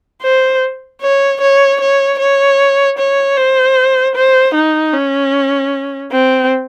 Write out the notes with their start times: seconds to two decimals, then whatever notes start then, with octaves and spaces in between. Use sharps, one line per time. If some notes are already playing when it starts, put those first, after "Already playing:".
0.23 C5
1.01 C#5
1.41 C#5
1.81 C#5
2.19 C#5
2.99 C#5
3.37 C5
4.16 C5
4.55 D#4
4.94 C#4
6.12 C4